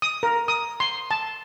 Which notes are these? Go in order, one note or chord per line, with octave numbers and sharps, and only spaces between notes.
D#6
A#4
D#6
C6
A5